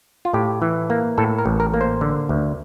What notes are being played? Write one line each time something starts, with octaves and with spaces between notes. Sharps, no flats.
F4
A2 G4
E3
A#3
A2 A4
A#4
A1
A#4
A#3
C5
D3
D2